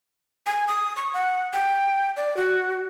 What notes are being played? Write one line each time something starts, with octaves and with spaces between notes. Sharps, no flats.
G#5
D#6
C#6
F#5
G5
D5
F#4